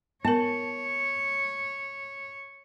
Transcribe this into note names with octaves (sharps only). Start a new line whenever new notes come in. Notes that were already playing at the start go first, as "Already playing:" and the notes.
B3 A#4 C#5 A5